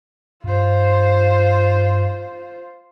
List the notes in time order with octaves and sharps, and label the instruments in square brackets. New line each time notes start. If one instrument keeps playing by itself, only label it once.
[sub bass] G2 [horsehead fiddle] F4 C5